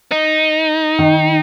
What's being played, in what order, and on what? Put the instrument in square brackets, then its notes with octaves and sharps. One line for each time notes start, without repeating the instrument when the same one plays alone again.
[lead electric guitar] D#4
[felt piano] D#3